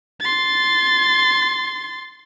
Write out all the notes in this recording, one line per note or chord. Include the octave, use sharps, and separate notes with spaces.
C6 A6